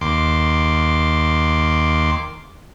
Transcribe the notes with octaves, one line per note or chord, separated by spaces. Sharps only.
D#2 C6 D6